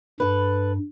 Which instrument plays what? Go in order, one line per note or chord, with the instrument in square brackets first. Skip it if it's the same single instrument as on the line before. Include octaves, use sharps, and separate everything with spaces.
[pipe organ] G2 [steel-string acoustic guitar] A4 B4